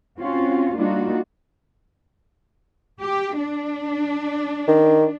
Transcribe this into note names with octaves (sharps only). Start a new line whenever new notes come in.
C4 C#4 F4 F#4
G3 A#3 D4 D#4 F4 F#4
G4
D4
D#3